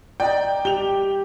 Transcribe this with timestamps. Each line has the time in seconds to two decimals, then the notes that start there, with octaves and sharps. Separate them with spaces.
0.20 D5 D#5 G5 A#5
0.65 G4 F7 G7